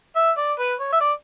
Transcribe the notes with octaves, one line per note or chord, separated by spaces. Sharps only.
E5
D5
B4
C#5
E5
D5